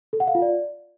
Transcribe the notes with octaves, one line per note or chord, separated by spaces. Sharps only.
A4
F#5
F5
F4
D5